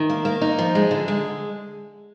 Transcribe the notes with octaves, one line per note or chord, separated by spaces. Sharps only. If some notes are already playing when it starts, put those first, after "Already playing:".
Already playing: D#3
A#3
A#3
D#4
F3
G#3
D3
G#3